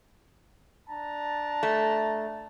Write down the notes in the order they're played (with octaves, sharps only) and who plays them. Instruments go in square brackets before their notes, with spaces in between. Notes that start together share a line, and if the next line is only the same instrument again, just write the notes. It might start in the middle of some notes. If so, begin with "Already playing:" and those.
[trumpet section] D4 A5 A#5
[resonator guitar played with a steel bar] A3